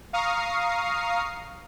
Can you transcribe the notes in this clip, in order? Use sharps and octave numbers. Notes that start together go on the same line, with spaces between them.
F5 A#5 C#6 D#6 F6 C7